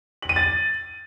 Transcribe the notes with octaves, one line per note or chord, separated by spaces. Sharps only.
F#7
D#7
A6